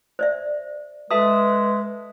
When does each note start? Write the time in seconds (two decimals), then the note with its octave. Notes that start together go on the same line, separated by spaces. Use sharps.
0.19 C5 D5 E5
1.11 G#3 F#4 A4 B4 E5 A5 D#6